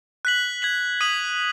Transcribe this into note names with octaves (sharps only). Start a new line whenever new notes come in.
F#6 B6 F#7
G#6 B6 F#7
D#6 B6 D#7 F#7